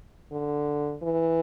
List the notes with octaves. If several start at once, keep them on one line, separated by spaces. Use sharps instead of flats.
D3
E3